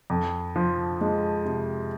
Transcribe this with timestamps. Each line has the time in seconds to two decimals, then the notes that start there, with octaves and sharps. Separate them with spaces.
0.10 F2
0.56 F3
1.01 G#3
1.45 C3